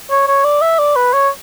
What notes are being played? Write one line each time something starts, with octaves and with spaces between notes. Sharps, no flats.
C#5
C#5
D5
E5
D5
B4
C#5